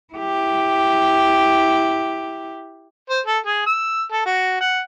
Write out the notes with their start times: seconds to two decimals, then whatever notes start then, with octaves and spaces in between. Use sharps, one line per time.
0.14 E4 G4
3.10 C5
3.26 A4
3.46 G#4
3.66 E6
4.11 A4
4.26 F#4
4.61 F#5